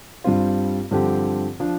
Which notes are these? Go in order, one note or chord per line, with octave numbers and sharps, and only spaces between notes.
G2 G3 C4 F4
G2 D3 F3 C4 G4
F3 D4